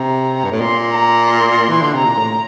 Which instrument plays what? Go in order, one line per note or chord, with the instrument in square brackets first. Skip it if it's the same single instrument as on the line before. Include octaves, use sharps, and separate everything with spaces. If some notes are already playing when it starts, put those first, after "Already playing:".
Already playing: [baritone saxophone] C3 [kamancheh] A#5
[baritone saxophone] G2
A2
[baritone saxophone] A#2 [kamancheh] C6
[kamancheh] A#5
C6
[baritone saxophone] E3
D3
[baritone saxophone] C3 [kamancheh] A#5
[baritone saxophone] A#2
A2